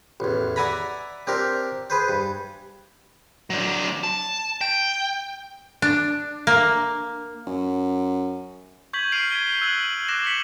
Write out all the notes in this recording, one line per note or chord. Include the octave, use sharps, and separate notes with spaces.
A1 E2
D5 E5 F#5 G#5 A#5 B5
C4 D4 G4 A#4
G#4 B4 C5
G2
F#3 D4
A5
G5
D4
A#3
F#2
C#6 G6 G#6 B6 F#7
F6 C7 D7 D#7 F7
G#6 B6 D7 G7
E6 F#6 G#6 D#7 F#7
D6 F#6 A#6 D7 E7
B6 C#7 F#7